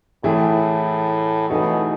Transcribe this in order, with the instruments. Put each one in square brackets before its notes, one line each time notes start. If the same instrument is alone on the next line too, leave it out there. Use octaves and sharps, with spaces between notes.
[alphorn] A2 [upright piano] E3 A3 E4 G#4
[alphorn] B2 [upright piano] E3 A3 D#4 G#4